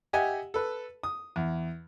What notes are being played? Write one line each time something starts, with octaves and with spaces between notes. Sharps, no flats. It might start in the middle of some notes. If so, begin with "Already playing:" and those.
G4 D#5 E5 F#5 G#5
A4 B4
D#6
E2